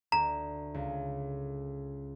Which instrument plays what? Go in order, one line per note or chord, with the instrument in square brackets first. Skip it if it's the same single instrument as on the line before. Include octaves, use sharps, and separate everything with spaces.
[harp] D2 [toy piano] A#5
[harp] C#2